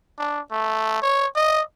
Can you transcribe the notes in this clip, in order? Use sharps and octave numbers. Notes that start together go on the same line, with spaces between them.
D4
A3
C#5
D#5